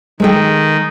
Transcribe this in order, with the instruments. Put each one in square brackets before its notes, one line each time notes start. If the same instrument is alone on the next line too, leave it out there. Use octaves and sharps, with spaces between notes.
[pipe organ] D#3 [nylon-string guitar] G#3 A4 G5